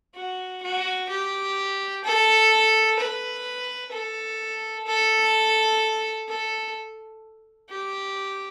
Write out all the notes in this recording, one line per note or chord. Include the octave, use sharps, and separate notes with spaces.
F#4
F#4
G4
A4
B4
A4
A4
A4
G4